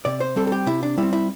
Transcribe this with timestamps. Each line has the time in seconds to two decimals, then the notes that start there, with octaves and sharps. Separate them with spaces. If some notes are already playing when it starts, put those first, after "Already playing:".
0.05 C3 D5
0.20 C5
0.36 G3 C4 A4
0.47 A4
0.52 G4
0.66 C3 E4
0.83 D4
0.98 G3 C4 E4
1.13 E4